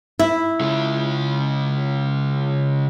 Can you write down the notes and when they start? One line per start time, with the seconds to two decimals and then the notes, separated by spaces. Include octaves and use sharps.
0.19 E4
0.61 C#3 G#3